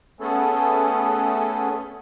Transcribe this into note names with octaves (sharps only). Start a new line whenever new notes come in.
A3 B3 C#4 G#4 A4